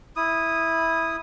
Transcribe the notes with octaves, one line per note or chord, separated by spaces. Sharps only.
E4 D#6